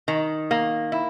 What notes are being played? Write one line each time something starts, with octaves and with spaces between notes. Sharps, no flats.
D#3
A#3
E4